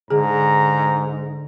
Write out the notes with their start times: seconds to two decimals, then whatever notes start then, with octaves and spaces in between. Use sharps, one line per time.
0.10 G#2 D3 G#4 A#5